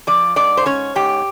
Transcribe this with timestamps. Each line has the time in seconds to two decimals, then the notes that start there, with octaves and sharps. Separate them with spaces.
0.07 F3 D5
0.36 G#2 D5
0.57 C5
0.66 C#4 C#5
0.96 G#2 G4